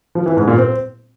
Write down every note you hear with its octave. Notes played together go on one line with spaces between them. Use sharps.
F3
E3
G#2
A#2
C4